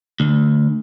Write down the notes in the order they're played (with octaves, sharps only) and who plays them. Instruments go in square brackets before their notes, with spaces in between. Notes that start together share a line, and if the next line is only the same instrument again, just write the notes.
[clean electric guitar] D2